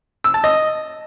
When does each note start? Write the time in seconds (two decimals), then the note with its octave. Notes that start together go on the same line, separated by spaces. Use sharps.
0.24 E6
0.34 A5
0.44 D#5